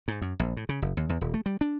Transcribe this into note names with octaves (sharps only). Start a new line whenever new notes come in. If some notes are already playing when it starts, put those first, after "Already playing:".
G#2
F#2
A#1
A2
C#3
F#1
D#2
E2
D#1
A3
G3
D4